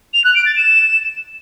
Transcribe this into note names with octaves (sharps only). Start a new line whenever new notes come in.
F7
F#6
D7
A6
E7